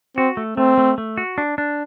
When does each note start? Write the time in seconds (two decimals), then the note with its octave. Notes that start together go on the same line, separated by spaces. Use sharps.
0.17 C4 F#4
0.37 A3
0.57 A3 C4
0.78 A3
0.98 A3
1.18 F#4
1.38 D4
1.58 D4